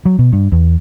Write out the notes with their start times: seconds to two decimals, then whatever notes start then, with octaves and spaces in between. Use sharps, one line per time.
0.05 F#3
0.19 B2
0.33 G2
0.52 E2